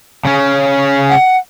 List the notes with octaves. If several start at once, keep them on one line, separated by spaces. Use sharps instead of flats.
C#3 C#4
F#5